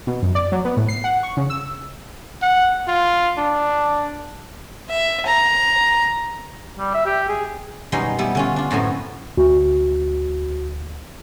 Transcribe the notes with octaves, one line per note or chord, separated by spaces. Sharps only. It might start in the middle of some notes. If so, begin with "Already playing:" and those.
B2
F#2
D5
F#3
B3
A2
C7
F#5
C#6
C#3
E6
F#5
F4
D4
E5
A#5
G3
E5
G4
G#4
F#2 B2 G3 C#4 D#4 C6
G3 B3 E4
D3 C#4 F4
D4 F4
F#2 A2 B3 C4 G#5
D2 F#4